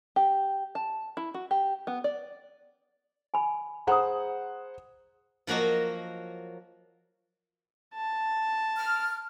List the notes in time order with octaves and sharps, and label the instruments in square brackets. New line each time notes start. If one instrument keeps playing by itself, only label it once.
[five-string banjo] G4
A5
E4
F#4
G4
B3
D5
[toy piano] G#5 B5
[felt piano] G#4 C5 F#5 [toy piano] A#5 B5 D#6
[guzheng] F3 F#3 A#3 F#4 D#5
[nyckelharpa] A5
[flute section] F6